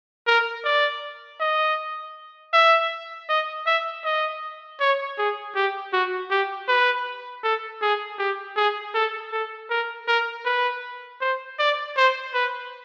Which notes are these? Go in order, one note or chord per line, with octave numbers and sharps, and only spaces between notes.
A#4
D5
D#5
E5
D#5
E5
D#5
C#5
G#4
G4
F#4
G4
B4
A4
G#4
G4
G#4
A4
A4
A#4
A#4
B4
C5
D5
C5
B4